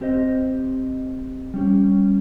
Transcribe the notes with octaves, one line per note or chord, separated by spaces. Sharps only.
C4 G4 C5 D#5
G3 C#4 G4